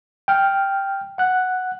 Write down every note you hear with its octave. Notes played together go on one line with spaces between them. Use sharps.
G5 F6
F#5 F#6